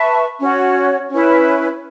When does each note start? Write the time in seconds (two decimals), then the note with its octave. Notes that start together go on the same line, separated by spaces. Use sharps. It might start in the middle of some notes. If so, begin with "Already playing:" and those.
Already playing: B4 E5 A5 C#6
0.39 C#4 F#4 C#5
1.10 C#4 E4 B4